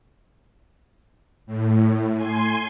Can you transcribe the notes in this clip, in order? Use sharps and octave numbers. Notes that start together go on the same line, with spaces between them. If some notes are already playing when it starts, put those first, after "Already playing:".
A2
G#5 C6